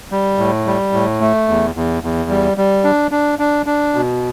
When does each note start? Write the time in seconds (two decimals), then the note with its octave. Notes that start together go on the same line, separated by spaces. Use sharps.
0.11 G3
0.38 A2
0.66 G3
0.92 A2
1.21 A3
1.48 E2
1.75 E2
2.03 E2
2.30 G3
2.58 G3
2.84 D4
3.11 D4
3.39 D4
3.66 D4
3.95 B2